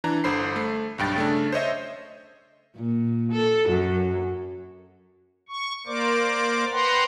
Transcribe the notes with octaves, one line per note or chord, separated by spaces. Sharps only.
E3 D4 A#5
G1 D3 C5 B5 C7
A3
B1 G2 G5 A6
C#3 A3 D4
C5 C#5 D#5 E5
A#2
A4
F#2
C#6
A#3 A#4 C5 D5 D6
B4 C5 F#5 G5 A#5 C6